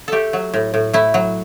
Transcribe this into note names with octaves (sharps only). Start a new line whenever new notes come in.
A3 G4 A4
F#3
A2
A2
A3 E4
F#3